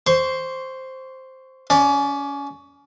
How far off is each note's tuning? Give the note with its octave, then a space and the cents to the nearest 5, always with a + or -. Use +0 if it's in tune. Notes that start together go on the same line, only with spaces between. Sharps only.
C5 +0 C#6 +25
C#4 +25 D5 +0